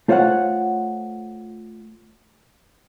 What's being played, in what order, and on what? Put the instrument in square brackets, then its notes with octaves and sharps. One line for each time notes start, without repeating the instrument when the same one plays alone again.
[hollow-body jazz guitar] A3 F4 C5 C#5 F5 F#5